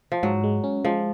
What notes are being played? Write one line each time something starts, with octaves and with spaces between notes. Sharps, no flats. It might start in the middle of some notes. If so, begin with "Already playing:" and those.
F3
G#2 F#3
G#3
C#4
F3 G#3